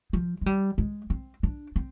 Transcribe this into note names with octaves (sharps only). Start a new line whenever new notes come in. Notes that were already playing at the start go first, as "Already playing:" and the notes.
F3
G#3
G3
G#3
C4
D4
C4